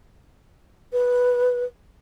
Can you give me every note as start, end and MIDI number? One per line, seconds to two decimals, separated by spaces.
0.92 1.64 71